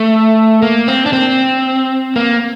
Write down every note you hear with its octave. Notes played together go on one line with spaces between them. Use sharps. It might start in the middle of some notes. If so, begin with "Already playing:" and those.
Already playing: A3
A#3
C4
D4
C4
A#3